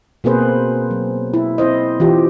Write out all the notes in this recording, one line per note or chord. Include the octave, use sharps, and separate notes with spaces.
B2 A#3 C4 G#4 B4 C5
F#3
E4
C4 E4 C5 D#5
E3 F4 G4